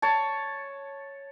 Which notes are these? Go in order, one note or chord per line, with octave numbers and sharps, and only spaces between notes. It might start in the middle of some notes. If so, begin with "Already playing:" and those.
C#5 A5